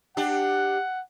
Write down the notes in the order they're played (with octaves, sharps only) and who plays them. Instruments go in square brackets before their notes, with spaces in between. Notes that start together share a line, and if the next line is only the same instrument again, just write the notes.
[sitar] D4 G4 [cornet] F#5